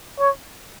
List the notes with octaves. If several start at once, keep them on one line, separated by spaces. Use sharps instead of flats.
C#5